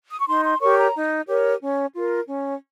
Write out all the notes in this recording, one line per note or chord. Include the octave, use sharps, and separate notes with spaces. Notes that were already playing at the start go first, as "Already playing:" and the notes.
D#6
C#6
D#4 C6
C6
G4 A#4 C#5 C#6
A#5
D#4
G4 A#4 C#5
C#4
F4 A#4
C#4